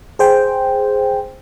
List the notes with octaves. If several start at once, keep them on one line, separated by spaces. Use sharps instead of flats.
G#4 C5 G5